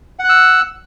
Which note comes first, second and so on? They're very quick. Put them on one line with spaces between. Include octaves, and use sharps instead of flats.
F#5 F#6 E6